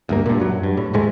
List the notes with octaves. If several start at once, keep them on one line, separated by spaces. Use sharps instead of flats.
D2 G2 A#3
G2 A#2
F#2 F#3
G2
A2
D#1 G#2 G#3 A3